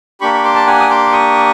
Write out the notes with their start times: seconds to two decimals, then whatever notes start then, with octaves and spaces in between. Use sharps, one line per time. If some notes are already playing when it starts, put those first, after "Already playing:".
0.21 A#3 D4 G4 B5 C#6
0.34 C#6
0.44 C6 D6
0.55 A5
0.67 F#5 G#5
0.80 D#6
0.89 C6 D6
1.12 C#6 D#6